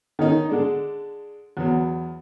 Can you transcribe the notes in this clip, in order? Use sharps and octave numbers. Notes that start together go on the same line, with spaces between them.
D#3 C#4 D#4 A#4
D3 G#3 D4
E2 F#3 B3